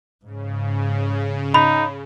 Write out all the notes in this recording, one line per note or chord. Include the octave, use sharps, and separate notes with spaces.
G#2 C#3
D#4 B5